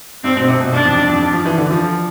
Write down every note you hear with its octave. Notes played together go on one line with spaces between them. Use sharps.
G2 C4
B2
C3
B2
G2 D4
F2
G2
F2
G2
F3
E3
D3
F3